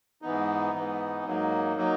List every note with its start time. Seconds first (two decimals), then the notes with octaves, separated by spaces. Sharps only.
0.22 G#2 E3 B3 D#4
0.74 G#2 E3 B3 D#4
1.25 G#2 F#3 A#3 D#4
1.77 F#3 A#3 D#4